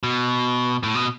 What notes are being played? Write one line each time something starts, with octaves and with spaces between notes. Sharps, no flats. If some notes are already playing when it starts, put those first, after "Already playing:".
B2
A2
B2